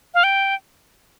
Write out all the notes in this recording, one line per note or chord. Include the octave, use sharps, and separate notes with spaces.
F5
G5